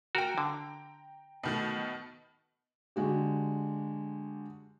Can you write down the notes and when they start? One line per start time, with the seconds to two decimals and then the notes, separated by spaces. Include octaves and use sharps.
0.15 F#4 A#4 G5 A#5
0.38 D3
1.43 B2 D#3 A3
2.96 D3 G#3 F#4 G4